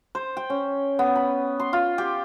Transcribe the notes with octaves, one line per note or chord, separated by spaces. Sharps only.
C5
G5
C#4
B3
B5
C6
F4
G4